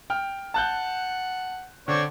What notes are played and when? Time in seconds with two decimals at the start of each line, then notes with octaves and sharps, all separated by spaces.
0.10 G5 F6
0.54 F#5 A5 F#6 G6
1.88 D3 C4 C#5 D5